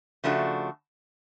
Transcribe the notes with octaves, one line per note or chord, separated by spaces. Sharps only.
C#3 F3 A3 D4 F#4